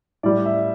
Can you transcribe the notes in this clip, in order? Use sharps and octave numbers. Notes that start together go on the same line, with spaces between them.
A2 G3 D5
E5